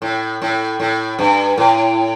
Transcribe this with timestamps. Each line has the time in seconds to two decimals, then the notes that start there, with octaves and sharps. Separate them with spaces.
0.02 A2
0.42 A2
0.80 A2
1.19 G2
1.58 A2